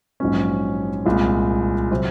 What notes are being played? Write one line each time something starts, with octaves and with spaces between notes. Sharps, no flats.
A#1 G#2 F#3 C#4
C2 A#2 G#3
C3 F#3 C4